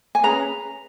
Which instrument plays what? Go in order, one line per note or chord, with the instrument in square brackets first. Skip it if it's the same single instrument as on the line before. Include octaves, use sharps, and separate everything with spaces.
[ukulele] G#5
C#4 G#4 B4 A#5